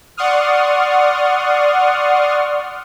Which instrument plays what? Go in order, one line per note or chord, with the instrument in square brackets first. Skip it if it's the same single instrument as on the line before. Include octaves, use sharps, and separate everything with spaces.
[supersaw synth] D5 F#5 C6 C#6 D#6 F6